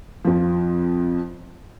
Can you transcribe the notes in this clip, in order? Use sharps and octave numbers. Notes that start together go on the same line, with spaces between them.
F2 F3